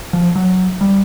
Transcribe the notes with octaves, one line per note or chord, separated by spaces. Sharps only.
F3
F#3
G3